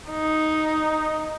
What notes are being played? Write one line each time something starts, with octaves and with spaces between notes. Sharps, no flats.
D#4